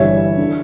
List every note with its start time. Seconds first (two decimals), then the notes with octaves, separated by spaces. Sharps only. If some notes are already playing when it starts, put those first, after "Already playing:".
Already playing: G1 G2 E3 G3 C#5 E5
0.38 D3